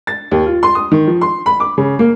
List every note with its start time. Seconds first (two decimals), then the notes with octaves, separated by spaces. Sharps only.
0.07 A6
0.31 D#2
0.46 F4
0.63 C6
0.75 D#6
0.92 D#3
1.07 F3
1.21 C6
1.46 B5
1.60 D6
1.78 C#3
1.99 A#3